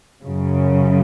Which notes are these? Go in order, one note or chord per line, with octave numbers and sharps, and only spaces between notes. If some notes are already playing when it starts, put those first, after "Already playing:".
F#2 C#3